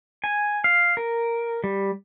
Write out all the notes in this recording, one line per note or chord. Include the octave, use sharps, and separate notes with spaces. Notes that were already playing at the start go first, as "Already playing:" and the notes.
G#5
F5
A#4
G3